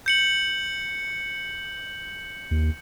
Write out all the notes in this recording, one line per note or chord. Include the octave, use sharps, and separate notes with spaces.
G6 C#7 F#7
D#2